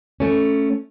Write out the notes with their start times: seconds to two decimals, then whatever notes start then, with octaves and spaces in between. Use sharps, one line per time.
0.20 A3 C#4